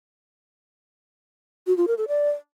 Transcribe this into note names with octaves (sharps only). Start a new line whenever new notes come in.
F#4
F4
A#4
A4
D5